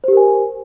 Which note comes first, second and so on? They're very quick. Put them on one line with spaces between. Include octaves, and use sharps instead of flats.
C5 G4 A#4 G#5